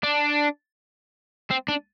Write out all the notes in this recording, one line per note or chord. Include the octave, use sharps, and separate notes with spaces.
D4
C4
D4